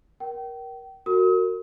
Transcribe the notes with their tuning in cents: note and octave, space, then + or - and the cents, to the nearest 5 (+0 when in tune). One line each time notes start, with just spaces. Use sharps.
A#4 +20 G5 -30
F#4 +0 A#4 -30 D#6 +40